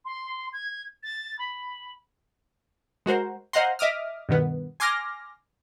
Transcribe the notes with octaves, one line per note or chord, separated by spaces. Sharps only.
C6
G#6
A6
B5
G#3 F#4 A#4 C5
C5 D#5 F5 F#5 A#5 C6
D#5 E5 D6 D#6 F6
G2 B2 D#3 B3
G#5 C6 D6 F6 A#6